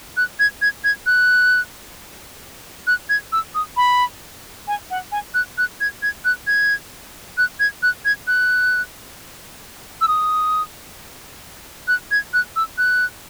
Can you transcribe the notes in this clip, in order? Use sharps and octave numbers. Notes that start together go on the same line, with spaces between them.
F#6
G#6
G#6
G#6
F#6
F#6
G#6
E6
D#6
B5
G#5
F#5
G#5
F#6
F#6
G#6
G#6
F#6
G#6
F#6
G#6
F#6
G#6
F#6
E6
D#6
F#6
G#6
F#6
E6
F#6